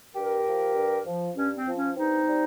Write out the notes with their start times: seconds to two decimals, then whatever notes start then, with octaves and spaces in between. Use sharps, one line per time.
0.15 G2 G4 A#4
0.46 F3
0.75 G2
1.06 F3
1.36 G2 C#4
1.56 C4
1.67 F3
1.77 C#4
1.96 G2 C4 D#4
2.27 G3